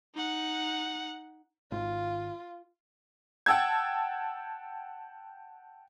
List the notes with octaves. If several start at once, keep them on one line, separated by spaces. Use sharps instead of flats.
D#4 F#5
G#1 F4
F#5 G5 A5 E6 G#6